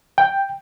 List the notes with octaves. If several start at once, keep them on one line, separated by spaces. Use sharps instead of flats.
G5